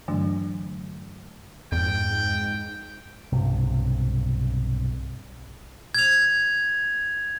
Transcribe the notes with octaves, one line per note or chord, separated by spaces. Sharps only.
G2 D3 E3 F#3 A3 D4
F2 G#2 G5
B1 G2 C3
G#6 F7